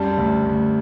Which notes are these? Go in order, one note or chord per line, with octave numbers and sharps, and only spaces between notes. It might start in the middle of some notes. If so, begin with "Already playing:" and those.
Already playing: F#2 G3 A5
D2
D2